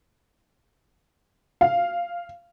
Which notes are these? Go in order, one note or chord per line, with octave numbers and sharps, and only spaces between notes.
F5